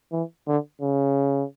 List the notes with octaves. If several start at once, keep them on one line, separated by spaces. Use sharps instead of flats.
E3
D3
C#3